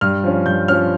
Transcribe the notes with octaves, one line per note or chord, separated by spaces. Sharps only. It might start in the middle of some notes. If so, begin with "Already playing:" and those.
G2 F6
F3 C#4
G2 G6
F3 C#4 F6